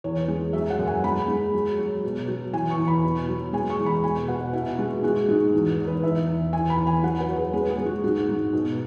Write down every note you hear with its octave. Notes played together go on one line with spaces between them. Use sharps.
E2 C#5
G#3
F#3 E5
F#5
F#2
G#5
G#3 B5
G#3
F#3
F#3
B2
F#3
E3 G#5
C#6
E2
B5
B2
F#3
G#3 G#5
C#6
E2
B5
B2 G#5
B2 F#5
B2 E4
G#3 F#4
G#3 F#4
G#2 F#4
E2
E2
B4
E2 E5
E2
E3 G#5
B5
E2
G#5
F#3 F#5
B4
F#3
G#4
G#3 B4
G#4
G#3
F#4
G#2 F#4
G#2
B2